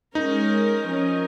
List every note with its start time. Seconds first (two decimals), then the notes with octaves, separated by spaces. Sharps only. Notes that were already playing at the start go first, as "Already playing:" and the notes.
0.15 G#3 C#4 D#4 A#4
0.87 F3 C#4 A#4 D#5